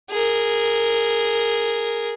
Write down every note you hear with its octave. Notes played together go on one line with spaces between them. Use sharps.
G#4 A#4